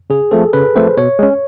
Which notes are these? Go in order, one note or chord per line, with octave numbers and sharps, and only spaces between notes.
C#3 G#4
F3 A3 C4 A4
C#3 B4
F3 A3 C4 C5
B2 C#5
G#3 C#4